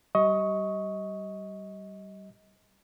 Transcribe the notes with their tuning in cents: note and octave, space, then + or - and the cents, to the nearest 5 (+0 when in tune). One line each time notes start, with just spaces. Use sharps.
G3 -25 D#5 +25 C#6 +0